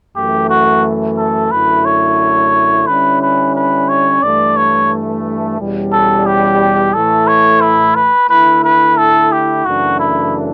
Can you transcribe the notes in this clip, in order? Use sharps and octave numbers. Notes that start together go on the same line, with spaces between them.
F#2 E3 A3 G4
F#4
A4
F#2 D3 A3 E4 B4
C#5
D3 G3 C#4 E4 B4
B4
B4
C#5
G2 E3 A3 D5
C#5
E2 B2 G3 C#4
A4
G4
A2 E3 A3 A4
C#5
E4
B4
D3 A3 E4 B4
B4
A4
G4
F#2 C#3 E3 A3 D4 F#4
E4